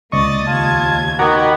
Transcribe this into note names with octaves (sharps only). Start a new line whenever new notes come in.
C#2 A#3 D5 D#5 C#6 D#6 A6
D#2 F4 A5 G#6
D#3 B3 F#4 F#5 A#5 D6